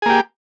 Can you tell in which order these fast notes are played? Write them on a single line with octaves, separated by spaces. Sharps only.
G#4 A#3 G4